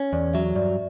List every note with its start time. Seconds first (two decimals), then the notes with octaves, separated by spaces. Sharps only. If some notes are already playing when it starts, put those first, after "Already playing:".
Already playing: C#4
0.13 E2 D5
0.34 F#3 E5
0.55 G2 D5